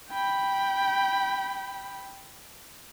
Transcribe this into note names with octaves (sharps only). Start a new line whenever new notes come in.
G5 B5